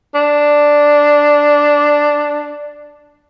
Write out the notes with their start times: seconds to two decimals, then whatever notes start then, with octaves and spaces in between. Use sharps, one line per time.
0.15 D4